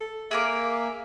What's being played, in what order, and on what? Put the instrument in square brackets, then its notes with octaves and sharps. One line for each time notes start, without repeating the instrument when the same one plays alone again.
[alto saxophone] A4
[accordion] A#3 [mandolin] G#4 A#4 D6 [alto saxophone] E5